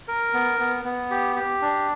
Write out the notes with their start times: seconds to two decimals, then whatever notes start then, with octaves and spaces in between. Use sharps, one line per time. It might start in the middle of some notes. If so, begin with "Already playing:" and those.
0.08 A#4
0.34 B3
0.60 B3
0.85 B3
1.11 G4
1.36 G4
1.62 D4